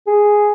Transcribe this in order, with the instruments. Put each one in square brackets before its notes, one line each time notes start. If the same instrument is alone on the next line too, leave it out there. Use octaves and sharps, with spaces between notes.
[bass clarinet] G#4